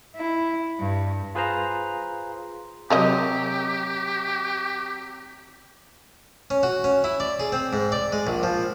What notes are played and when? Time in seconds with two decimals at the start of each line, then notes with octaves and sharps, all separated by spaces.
0.16 E4
0.79 G2
1.35 F4 G#4 B4 C5 F5 A#5
2.90 C3 F#3 G#3 G4 A#4 D#5
6.50 C#4
6.63 F#4
6.84 C#4
7.04 E4
7.20 D5
7.40 G#4
7.52 C4
7.73 G#2
7.92 D5
8.12 G#3
8.27 A#1
8.43 F3